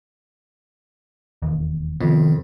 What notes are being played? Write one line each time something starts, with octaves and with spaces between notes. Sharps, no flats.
E1 D#2
F2 C3 D#3 B3